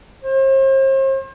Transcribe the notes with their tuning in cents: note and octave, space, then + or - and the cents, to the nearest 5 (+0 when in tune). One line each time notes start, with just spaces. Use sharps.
C5 +40